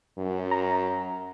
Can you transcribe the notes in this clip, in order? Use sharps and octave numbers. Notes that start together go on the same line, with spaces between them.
F#2
A#5